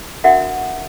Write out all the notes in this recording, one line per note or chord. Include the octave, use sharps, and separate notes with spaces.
D4 F#4 A#4 E5 F#5